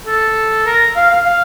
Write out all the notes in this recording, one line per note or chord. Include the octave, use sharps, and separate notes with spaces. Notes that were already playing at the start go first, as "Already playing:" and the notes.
A4
A#4
F5
F5
F5